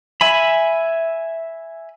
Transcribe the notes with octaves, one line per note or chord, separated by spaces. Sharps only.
E5 G#5 B5